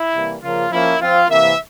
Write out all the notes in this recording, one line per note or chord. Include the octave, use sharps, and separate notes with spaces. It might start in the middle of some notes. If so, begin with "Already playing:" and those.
Already playing: E4
C3 E3 G3 A#3
C#3 F3 A#3 F4
F3 A#3 C#4 E4
F3 C4 F4
C3 E3 A#3 E5